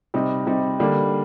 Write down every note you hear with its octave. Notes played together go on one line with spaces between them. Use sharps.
C3 G3 C4 D#4
C3 G3 C4 D#4
D3 G3 A#3 D4